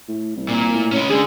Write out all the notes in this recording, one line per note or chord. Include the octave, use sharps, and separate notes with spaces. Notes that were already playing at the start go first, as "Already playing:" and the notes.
A2
C2
A#2
A2
G#3 C#4
C#2 D3 G#4